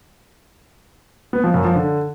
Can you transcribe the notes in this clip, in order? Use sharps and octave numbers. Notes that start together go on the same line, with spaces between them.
B3
F3
F#2
F3
D3